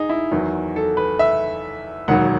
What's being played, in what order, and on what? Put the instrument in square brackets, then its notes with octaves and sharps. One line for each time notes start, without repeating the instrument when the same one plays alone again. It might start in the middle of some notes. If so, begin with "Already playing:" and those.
Already playing: [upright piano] D#4 G#4
E4
E2 D#3 F#3
A4
B4
E5
E1 D#2 D#3 F#3 F#5